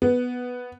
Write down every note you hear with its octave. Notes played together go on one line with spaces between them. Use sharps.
B3